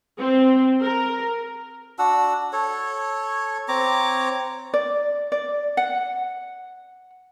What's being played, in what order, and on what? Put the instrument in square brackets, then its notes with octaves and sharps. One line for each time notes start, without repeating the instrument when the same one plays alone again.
[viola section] C4
A#4
[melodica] D4 F#4 F#5 E6
A4 C#5
C4 C#5 A#5 D6
[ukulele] D5
D5
F#5